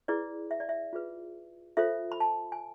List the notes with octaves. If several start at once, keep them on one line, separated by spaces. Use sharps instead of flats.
E4 G#4 B4 D5
E5
D5
E5
F4 G#4 B4
F4 A4 C5 E5
B5
A5
G#5